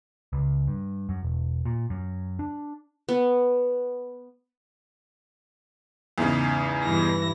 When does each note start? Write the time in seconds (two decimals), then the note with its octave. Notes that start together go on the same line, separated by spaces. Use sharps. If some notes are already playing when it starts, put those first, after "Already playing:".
0.33 C#2
0.67 G2
1.09 F#2
1.23 E1
1.65 A#2
1.90 F#2
2.39 D4
3.09 B3
6.18 E2 G#2 C#3
6.84 G2 E3 A#6